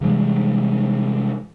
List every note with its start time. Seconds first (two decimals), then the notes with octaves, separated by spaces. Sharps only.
0.01 C3 E3 G3 G#3